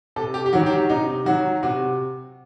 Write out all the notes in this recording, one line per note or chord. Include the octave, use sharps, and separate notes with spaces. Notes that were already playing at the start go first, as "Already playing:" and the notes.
C3 A4
G4
G4
D#3 F#3 F#4
G4
F#4
C3 D#4
D#3 F#3 F#4
C3 F#4